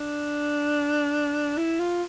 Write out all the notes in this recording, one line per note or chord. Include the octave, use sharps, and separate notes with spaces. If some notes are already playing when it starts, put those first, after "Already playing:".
Already playing: D4
E4
F4